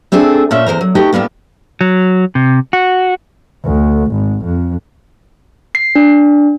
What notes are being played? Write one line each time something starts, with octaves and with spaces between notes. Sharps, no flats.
A3 C4 D4 G#4 A4
A#2 A3 C#4 E5
E2 E3 C5 A#5
F#3
A3 B3 D#4 F#4 G4
A2 G3 A#3 B3
F#3
C3
F#4
D2
G#1
F2
C7
D4